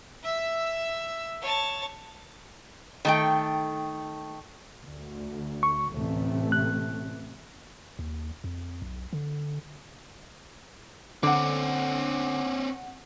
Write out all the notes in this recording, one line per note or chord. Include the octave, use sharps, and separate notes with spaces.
E5 E6
C#5 A5
D#3 A3 G5
D2
C#6
A1 D2 C3 A3
F#6
D#2
F2
B1
D3
D3 C4 C#4 F#5 D6